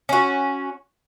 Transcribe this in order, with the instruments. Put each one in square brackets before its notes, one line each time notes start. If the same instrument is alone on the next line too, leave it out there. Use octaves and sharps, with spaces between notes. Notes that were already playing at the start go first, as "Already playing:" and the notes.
[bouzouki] C#4 F#4